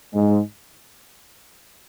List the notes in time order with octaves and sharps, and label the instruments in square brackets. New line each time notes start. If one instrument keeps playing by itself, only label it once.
[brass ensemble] G#2 G#3